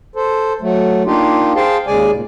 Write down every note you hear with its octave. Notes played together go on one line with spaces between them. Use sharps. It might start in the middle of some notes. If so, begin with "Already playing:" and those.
A4 C5
F#3 A3
A#3 D4 D#4 F4 G4
G#4 C5 F5 G5 A5
D#2 C#3 G#3 G#4 D5 G#5
A#2